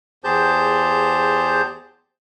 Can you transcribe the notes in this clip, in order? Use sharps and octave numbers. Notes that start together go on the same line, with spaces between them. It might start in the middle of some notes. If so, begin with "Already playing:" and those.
E2 G4 G#4 C5 A5 G6